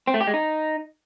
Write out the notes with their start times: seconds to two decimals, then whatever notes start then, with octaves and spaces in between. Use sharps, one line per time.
0.07 C4
0.14 A3
0.21 G4
0.27 G#3
0.34 D#4